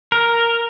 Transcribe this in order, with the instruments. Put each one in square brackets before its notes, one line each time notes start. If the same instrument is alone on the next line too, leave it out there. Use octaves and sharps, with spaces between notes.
[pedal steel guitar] A#4